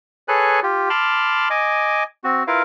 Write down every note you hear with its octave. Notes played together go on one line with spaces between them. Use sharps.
G#4 A4 B4 C#5 G#5 F#6
F4 G4
A5 B5 C6 D6 F6
D#5 G#5 D6
C4 F#4
E4 F4 A#4 B4 F5